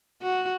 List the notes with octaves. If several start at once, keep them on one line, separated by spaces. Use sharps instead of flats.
F#4